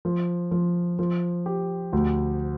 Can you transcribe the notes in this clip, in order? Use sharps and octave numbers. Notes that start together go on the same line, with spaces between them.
F3
F3
F3
G4
D2